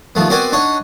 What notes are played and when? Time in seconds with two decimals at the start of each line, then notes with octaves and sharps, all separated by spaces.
0.15 D#2 F3 A3 B3
0.29 B3 C4 F#4 A#4 D5 G#5
0.52 D4 D#4 C#5 F#5